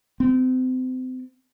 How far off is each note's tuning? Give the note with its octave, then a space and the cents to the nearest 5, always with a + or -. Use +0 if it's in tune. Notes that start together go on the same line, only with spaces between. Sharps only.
C4 -35